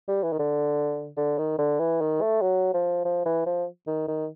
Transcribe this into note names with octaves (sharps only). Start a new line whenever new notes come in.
G3
E3
D#3
D3
D3
D#3
D3
E3
D#3
A3
F#3
F3
F3
E3
F3
D#3
D#3